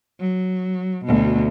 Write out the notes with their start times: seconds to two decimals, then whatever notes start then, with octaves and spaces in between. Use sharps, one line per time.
0.20 F#3
1.05 D2 B2